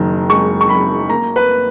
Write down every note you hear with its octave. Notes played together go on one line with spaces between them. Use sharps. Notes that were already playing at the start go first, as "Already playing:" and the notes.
Already playing: F#1 D#3
G#3 C#6
C#6
F#2 B5
A#3 A#5
B4